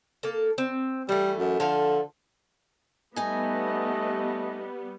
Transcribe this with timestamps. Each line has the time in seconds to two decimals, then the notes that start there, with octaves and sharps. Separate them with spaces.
0.23 A#3 A4
0.58 C4
1.09 E3 G3 A3
1.37 F#2
1.60 D3 F3 A4 F5
3.16 G3 A3 B3 D#4 D#5 G#5